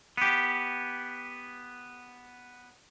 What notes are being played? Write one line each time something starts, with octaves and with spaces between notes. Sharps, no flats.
B3 G4